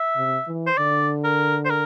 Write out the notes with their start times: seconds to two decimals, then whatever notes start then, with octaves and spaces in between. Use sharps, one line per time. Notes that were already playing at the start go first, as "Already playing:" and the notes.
Already playing: E5
0.16 C3
0.47 E3
0.67 C5
0.78 D3 D5
1.24 A#4
1.65 C5
1.70 A#4